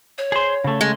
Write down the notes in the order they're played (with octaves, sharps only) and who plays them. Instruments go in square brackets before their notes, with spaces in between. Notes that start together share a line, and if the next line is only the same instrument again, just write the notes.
[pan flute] C#5
[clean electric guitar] G#4 C5
C#3 A3
[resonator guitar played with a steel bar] G#3